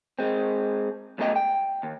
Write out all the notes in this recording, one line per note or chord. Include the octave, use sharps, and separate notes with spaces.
G#3 C4
F#2 B2 A3 C#4 D#5 G5
G5
D#2